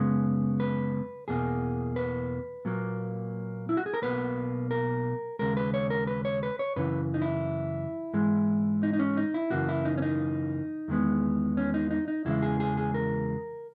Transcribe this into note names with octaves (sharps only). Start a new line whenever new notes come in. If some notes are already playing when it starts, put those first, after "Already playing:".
Already playing: F#2 C#3 G#3 B3
B4
E2 B2 A#3 G#4
B4
A#2 F#3 A#3
E4
F#4
G#4
A#4
B1 B2 A#3 B4
A#4
D#2 C#3 G#3 A#4
B4
C#5
A#4
B4
C#5
B4
C#5
F#2 C#3 E3 B4
D#4
E4
G#2 E3 G#3
D#4
D#4
C#4
D#4
E4
F#2 C#3 E3 A#3 F#4
E4
D#4
C#4
D#4
E2 D#3 G#3 B3
C#4
D#4
D#4
D#4
E2 C#3 E3 G#3 E4
G#4
G#4
G#4
A#4